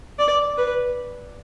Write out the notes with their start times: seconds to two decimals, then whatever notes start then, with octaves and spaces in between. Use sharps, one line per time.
0.19 D5
0.57 B4